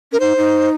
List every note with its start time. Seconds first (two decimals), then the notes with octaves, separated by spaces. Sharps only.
0.12 C#4 A#4
0.20 D#4 C5
0.37 D#4